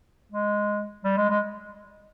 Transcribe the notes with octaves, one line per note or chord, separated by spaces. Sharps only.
G#3
G3
G#3
G#3